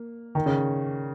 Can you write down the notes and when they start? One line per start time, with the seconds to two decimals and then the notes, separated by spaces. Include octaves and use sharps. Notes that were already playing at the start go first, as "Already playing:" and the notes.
Already playing: A#3
0.35 D#3
0.46 C#3